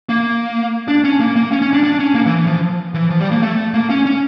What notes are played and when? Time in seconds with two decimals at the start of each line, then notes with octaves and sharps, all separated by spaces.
0.09 A#3
0.88 D4
1.04 C#4
1.20 A#3
1.36 A#3
1.51 C#4
1.62 C#4
1.73 D4
1.84 D4
1.99 C#4
2.15 A#3
2.26 E3
2.36 E3
2.47 F3
2.94 E3
3.10 F3
3.20 G3
3.31 A#3
3.42 A3
3.74 A#3
3.90 C#4
4.06 C#4